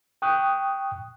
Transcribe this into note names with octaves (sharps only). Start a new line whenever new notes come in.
G5 C#6 D#6 F#6